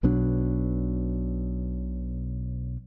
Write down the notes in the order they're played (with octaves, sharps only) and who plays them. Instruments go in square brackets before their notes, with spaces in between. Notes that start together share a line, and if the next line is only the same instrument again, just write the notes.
[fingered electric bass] B1 B2 F#3 D4